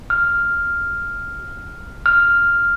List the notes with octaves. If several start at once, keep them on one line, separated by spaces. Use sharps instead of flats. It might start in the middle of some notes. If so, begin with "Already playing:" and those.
F6
F6